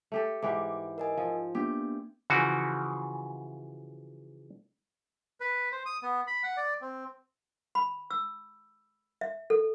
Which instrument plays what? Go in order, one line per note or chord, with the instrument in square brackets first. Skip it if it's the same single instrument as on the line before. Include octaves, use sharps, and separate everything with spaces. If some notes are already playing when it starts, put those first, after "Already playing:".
[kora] A3 G4 A4
[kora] G#2 E3 G4 [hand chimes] D6
[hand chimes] A#4 D#5 G#5
[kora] F3
[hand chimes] A#3 B3 D4 [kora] G4
[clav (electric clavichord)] C#3 E3 F3 F#4
[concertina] B4
C5
D#6
B3
B5
F#5
D5
C4
[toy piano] B5
E6
E5
A4